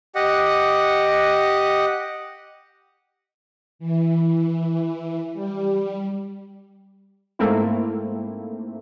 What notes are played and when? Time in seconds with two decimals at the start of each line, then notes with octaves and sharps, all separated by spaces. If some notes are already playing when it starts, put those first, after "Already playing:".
0.15 G4 D#5 F#5
3.79 E3
5.33 G3
7.39 G#2 A3 A#3 C4 E4